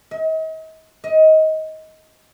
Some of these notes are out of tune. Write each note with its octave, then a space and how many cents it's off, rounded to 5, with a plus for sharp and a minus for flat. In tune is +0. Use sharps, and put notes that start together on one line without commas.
D#5 +40
D#5 +20